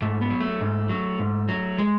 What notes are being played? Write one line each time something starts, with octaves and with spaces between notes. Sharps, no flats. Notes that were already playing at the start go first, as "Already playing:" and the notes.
G#2 A3
B3
F#3
A3
G#2
F#3
G#2
F#3
G#3